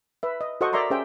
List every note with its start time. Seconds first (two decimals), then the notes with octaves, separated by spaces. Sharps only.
0.23 B4 E5
0.41 D#5
0.61 F#4 A4 C5 D#5 F#5 C#6
0.73 A#4 D5 E5 A#5 C6 C#6
0.90 C#4 G4 G#4 C5 E5 G5